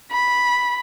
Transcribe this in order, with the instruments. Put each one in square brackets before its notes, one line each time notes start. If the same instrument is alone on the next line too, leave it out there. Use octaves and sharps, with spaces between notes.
[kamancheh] B5